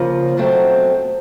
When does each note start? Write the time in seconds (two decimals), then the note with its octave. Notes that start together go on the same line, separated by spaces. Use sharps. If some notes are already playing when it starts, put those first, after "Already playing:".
Already playing: C#3 F3 A#3
0.37 B2 F#3 A3 C4